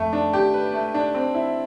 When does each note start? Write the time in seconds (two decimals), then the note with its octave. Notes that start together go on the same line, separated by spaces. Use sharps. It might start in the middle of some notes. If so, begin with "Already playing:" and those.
Already playing: F2 A3
0.13 D4
0.33 G4
0.54 B4
0.74 A3
0.94 D4
1.14 C4
1.34 E4